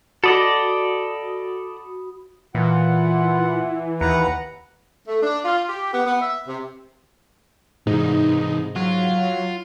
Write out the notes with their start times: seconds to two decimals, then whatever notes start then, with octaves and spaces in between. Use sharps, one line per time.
0.24 F#4 A4 D5 D#5 B5 D#6
2.55 A#2 E3 F4 F#5
4.01 D#2 B4 F#5 A#5
5.07 A3
5.23 D4
5.44 F4
5.68 G4
5.92 B3
6.05 B3
6.21 E5
6.47 C3
7.87 G#2 C3 E3 D#4
8.76 F#3 F4